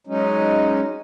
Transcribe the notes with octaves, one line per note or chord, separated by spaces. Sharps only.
F#3 G#3 C#4 D#4